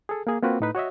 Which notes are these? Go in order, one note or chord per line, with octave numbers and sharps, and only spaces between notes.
G#4 A4
A#3 G#4
A#3 C4 F4 F#4 A#4 B4
A2 D#4 B4
F#4 C#5 D#5 E5